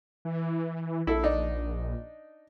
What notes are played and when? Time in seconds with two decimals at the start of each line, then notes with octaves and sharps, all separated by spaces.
0.25 E3
1.07 A#1 E4 A4
1.24 D4 D#4